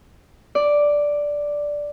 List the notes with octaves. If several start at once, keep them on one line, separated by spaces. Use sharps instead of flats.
D5